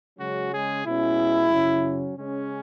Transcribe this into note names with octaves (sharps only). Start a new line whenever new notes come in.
C#3 F#3 G#3 C#4 F#4
G#3 G#4
B2 G#3 C#4 E4
F#2 C#3 F#3 C#4
C#3 G#3 C#4